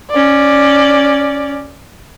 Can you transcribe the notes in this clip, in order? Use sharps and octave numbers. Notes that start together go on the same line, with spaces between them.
C#4 D5